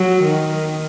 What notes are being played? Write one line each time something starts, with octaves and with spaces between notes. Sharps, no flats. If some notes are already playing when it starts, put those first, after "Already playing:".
Already playing: F#3
D#3